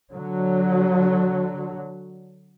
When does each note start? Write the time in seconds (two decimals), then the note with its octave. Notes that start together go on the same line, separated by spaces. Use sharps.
0.12 D3 F#3